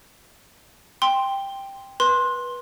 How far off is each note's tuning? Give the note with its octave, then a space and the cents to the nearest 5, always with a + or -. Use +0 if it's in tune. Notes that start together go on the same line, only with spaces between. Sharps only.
G5 +5 C6 +0
B4 -20 C6 +15